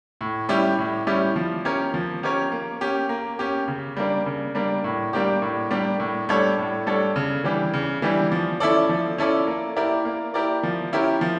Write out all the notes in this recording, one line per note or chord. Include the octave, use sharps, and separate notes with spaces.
A2
G3 C#4 E4 G4
A2
G3 C#4 E4 G4
F3
C#4 G4 A#4 C#5
F3
C#4 G4 A#4 C#5
A#3
C#4 G4
A#3
C#4 G4
C#3
G3 A#3 D4
C#3
G3 A#3 D4
A2
G3 A#3 D4 G4
A2
G3 A#3 D4 G4
A2
G3 D4 A4 C#5
A2
G3 D4 A4 C#5
C#3
E3 G3 D4 G4
C#3
E3 G3 D4 G4
F3
C#4 E4 A4 D5
F3
C#4 E4 A4 D5
A#3
E4 G4 A#4 D5
A#3
E4 G4 A#4 D5
F3
C#4 E4 G4 A#4
F3